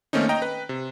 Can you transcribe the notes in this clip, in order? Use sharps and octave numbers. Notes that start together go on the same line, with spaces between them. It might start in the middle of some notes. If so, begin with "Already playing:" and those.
D#3 A3 A#3 C4 C#4 D#4
D#5 G5 A#5
B4
C3